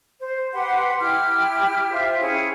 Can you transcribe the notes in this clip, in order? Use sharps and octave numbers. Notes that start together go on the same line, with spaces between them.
C5
G4 B4 F#5 C6
E4 G4 G5 F6
F4 C5 E5
C#4 E4 G#4 G5